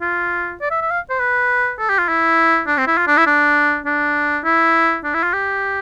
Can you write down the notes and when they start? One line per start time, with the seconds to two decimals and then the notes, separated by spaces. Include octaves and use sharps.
0.02 F4
0.61 D5
0.71 E5
0.81 E5
0.91 F5
1.10 C5
1.20 B4
1.79 A4
1.89 G4
1.99 F4
2.08 E4
2.67 D4
2.78 C4
2.87 E4
2.97 F4
3.07 D4
3.17 E4
3.26 D4
3.86 D4
4.44 E4
5.04 D4
5.14 E4
5.23 F4
5.33 G4